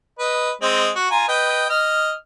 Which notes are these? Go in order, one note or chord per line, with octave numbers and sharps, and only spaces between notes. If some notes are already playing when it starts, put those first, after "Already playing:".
B4 D#5
G#3 C4 D#5
F#4
F4 G#5 A#5
B4 D#5 G5
D#5 F6